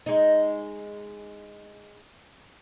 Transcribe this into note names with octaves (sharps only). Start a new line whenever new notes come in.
G#3 D#4